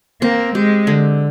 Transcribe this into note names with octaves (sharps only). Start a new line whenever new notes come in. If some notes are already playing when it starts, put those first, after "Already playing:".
A#3 C4
G#3 G4
D3